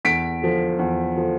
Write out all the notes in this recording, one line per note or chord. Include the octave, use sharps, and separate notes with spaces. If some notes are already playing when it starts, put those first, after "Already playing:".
E2 B6 D7
D3 F3
E2
D3 F3